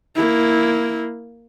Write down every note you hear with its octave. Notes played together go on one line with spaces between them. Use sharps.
A#3 E4